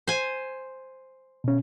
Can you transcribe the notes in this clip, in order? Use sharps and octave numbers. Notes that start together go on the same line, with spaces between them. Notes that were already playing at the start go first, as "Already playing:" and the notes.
C5 G#5
B2 C#4